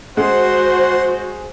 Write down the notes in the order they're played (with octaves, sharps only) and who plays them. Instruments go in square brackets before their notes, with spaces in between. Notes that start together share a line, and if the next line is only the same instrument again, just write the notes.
[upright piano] G#3 [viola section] F#4 C5 [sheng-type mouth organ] F#5 C6